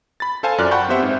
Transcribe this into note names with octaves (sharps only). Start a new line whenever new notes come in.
B5 A6
A4 C5 F5 G#5 A5
F#2 F4 D5 F6 F#6
F#5 G5 A5 B5 C#6 G6
B3 C4 G4 C5 E5 F#5
G#2